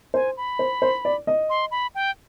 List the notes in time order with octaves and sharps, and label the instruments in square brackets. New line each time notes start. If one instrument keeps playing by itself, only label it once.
[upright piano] C5 [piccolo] G#5
[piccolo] B5
[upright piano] C5
C5
D5
D#5
[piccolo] C6
B5
G5